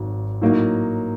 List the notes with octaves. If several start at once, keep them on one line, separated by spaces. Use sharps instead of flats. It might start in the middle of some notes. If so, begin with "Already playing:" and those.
Already playing: G#1 G#2 F#3
A2 F#3 A#3 D#4